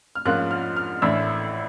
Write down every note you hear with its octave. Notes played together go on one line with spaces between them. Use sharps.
F6
G#2 F3 A#3 C#4 F4 F#6
F6
F6
A1 A2 E3 A3 D4 E6